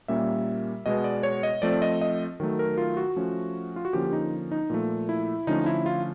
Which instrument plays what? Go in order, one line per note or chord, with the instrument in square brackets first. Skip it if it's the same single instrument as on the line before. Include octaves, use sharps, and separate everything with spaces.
[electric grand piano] A#2 G3 A#3 C#4 E5
B2 G#3 B3 D#5
D5
C#5
D#5
F3 A3 C4 D5
D#5
D#5
D#3 F#3 A3
A#4
F4
F#4
F3 A3 C#4
F4
F#4
D3 F3 A#3 C#4 G4
D#4
D#4
A#2 F3 A3
E4
D3 F3 A3 C#4 D#4
E4
F4